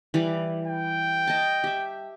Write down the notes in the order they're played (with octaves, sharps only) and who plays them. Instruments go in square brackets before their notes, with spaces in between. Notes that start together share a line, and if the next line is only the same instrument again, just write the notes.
[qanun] E3 G3 D6
[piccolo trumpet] G5
[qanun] D#5 A5
G4 E5